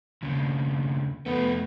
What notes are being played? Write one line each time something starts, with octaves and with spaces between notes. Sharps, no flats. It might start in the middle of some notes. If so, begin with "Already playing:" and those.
D#2 C#3
F2 A3 B3